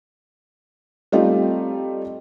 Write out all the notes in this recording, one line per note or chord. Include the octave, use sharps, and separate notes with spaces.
G3 A3 C4 D#4 F4